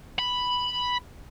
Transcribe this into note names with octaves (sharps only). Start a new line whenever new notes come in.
B5